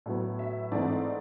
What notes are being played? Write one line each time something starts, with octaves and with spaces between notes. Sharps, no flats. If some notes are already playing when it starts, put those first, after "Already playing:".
A2 F#3 B3
E5
G#2 E3 A3 C4 D5